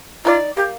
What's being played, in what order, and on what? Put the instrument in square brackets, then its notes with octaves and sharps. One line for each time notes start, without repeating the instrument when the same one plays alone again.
[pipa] D#4 A#4 D5 [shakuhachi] F4
[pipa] A#3 [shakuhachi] G4